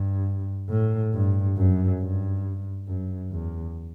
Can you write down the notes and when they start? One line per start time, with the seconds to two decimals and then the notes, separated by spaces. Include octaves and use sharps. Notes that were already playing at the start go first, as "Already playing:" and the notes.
Already playing: G2
0.70 A2
1.14 G2
1.57 F#2
2.01 G2
2.87 F#2
3.32 E2